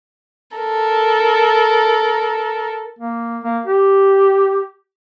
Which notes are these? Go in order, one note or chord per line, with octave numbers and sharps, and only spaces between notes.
A4 A#4
A#3
A#3
G4